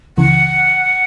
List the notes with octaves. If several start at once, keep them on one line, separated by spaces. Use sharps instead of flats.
C#2 C#3 E3 F#5